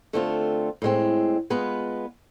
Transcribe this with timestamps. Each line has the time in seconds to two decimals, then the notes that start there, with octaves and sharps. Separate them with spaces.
0.13 D3 A3 C4 F4
0.82 A2 G#3 C4
1.50 G#3 B3 F4 B4